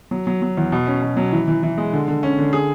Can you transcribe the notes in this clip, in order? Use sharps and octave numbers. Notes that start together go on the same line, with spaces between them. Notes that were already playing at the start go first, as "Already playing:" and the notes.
F#3
F#3
F#3
E2
B2
C#4
B2
F#3
E3
E3
E3
G#3
D3
D3
C#4
D3
G#4